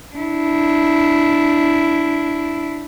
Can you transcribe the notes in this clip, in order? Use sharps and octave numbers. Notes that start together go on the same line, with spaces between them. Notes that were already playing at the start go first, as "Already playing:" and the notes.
D4 E4